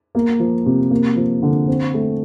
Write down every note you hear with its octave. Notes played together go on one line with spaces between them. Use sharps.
A#3
F3
C3
A#3
F3
D3
C4
A3